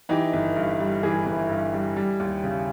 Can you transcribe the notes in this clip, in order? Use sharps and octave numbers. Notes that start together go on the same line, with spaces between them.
E3 D#4 G4
G1
G2
G3
E3 E4 G#4
G1
G2
G3
G3
D#2
C#3